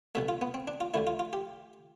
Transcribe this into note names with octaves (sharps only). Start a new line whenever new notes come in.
B1 B2 A3 E5
F4
B3
C4
D4
F4
D2 D3 A3 E4
F4
F4
G4